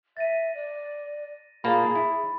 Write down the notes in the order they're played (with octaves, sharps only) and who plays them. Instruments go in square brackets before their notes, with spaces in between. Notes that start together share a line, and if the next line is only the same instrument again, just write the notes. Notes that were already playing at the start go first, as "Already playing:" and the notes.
[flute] E5 [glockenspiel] A6 A#6 D#7
[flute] D5
[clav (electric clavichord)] A#2 A#3 A5 [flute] G#4 [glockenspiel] B5 A6
[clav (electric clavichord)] E4